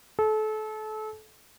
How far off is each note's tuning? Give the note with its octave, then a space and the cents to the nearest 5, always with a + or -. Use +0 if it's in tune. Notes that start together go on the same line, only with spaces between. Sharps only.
A4 -30